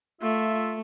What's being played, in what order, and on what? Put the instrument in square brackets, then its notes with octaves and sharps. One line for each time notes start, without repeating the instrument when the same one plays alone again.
[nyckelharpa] A3 [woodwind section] F4 E5